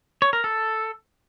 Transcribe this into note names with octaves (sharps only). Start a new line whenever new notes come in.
C#5
A#4
A4